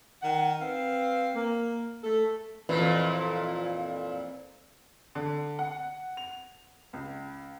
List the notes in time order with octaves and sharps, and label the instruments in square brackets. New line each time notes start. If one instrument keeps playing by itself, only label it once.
[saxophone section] D#3 F#5
C4 B4 F5
A#3
A3 A4
[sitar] F2 A#2 E3
[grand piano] D3
F#5
F7
C#2